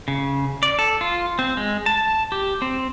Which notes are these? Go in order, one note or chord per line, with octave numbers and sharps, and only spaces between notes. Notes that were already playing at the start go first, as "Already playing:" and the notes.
C#3
D5
A4
F4
C4
G#3
A5
G4
C4